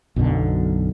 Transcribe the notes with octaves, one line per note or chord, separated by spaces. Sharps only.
B1 F#2 B2 D3